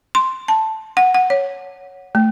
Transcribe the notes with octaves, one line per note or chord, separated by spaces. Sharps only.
C6
A5
F#5
F#5
C#5
A3